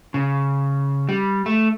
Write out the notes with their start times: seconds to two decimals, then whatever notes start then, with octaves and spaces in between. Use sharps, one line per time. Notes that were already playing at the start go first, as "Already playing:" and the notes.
0.14 C#3
1.09 G3
1.46 A3